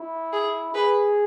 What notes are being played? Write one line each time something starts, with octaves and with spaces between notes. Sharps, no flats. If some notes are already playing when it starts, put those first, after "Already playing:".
Already playing: E4
G#4
G#4 B4